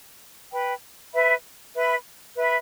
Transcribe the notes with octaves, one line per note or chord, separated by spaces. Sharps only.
B4 G5 B5
B4 E5 B5
B4 E5 B5
B4 E5 B5